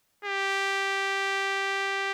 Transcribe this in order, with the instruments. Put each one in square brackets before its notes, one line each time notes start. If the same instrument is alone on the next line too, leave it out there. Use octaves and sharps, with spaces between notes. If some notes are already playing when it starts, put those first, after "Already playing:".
[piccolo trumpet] G4